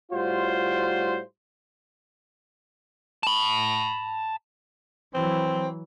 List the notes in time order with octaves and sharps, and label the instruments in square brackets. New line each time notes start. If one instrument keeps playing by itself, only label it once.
[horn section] A2 G3 F4 F#4 C5 C6
[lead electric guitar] A5 B5
[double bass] E3 F#3 [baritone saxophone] C4